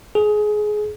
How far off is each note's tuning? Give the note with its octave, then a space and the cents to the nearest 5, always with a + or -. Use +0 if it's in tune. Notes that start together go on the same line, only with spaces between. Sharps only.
G#4 +20